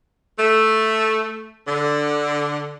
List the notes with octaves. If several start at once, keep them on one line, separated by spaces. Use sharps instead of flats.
A3
D3